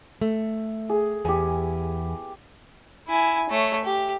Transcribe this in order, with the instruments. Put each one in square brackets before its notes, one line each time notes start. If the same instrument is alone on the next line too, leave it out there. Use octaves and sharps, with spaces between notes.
[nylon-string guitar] A3
[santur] G#4
[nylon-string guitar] E2 [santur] G4 G#5
[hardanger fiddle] E4 G#5
A3 C#5
G4